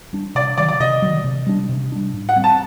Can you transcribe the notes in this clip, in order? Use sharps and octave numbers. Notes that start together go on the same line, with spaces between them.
G3 D4
C3 D5
D#3 F#3 D5
D5
C3 D#5
D#3 F#3
C3
G3 D4
C3
G3 D4
A2
F#5
G3 C4
A5